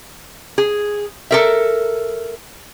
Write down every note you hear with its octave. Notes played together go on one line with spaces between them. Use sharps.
G#4
A4 A#4 E5